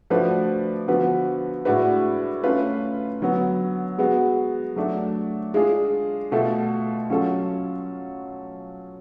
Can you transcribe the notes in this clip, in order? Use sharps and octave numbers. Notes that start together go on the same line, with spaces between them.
F3 A3 D4 F#4 B4
D3 F3 B3 F#4 B4
A2 G#3 D4 F#4 B4
A3 C#4 F4 B4
D3 F#3 B3
G#3 B3 F#4
F#3 A3 D4
G#3 D4 F4 G#4
B2 A3 F4 A4
F#3 C#4 F4 A4